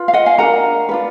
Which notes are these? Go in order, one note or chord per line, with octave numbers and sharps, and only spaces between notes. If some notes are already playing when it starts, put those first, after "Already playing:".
Already playing: F4 B4
F5
D#5 F#5
F5 G#5
D4 F#4 A#4 F#5 A#5
D4 F4 B4